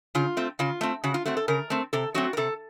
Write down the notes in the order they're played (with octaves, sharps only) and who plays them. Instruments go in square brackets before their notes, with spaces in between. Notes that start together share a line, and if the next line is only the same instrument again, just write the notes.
[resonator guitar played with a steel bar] C#3 F4
A3 C4
C#3 F4
A3 C4
C#3 F#4
F4
A3 C4 F#4
A4
C#3 A#4
A3 C4
C3 A4
F#3 A3 C4 F#4
A#4
C3 A4